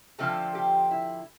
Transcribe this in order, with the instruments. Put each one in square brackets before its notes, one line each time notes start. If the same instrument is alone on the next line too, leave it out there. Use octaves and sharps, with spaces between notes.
[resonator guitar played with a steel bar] D3 F3 A3 C4 A4
G4
E4